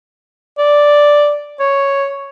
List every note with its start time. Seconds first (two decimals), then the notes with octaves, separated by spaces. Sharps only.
0.58 D5
1.60 C#5